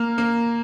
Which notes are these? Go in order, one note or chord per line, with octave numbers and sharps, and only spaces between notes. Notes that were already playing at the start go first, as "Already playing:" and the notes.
Already playing: A#3 F6
A#3